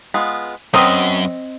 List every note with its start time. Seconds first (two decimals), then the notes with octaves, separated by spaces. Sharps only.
0.14 G#3 B3 F4
0.74 F#2 B3 C4 A#4 D#5 G5 D#6